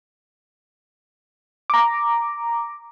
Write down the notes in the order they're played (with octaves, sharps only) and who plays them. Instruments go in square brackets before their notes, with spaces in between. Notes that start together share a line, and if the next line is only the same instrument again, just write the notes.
[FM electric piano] A#5 D6